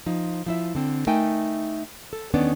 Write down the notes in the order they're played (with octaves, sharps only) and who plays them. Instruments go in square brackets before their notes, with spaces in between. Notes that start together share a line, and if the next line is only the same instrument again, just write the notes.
[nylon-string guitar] F3 D#4
F3 E4 E5
D3 C4
A3 D#4 A#4 G5 G#5
A4
E2 D#3 B3 C#4 D4 D5